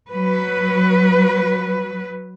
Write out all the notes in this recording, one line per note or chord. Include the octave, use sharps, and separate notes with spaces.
F#3 B4